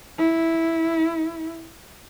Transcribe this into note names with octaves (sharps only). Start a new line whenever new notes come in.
E4